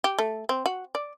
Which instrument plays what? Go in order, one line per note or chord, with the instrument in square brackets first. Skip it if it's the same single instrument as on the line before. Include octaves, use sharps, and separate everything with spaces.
[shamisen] G4
A3
C4
F#4
D5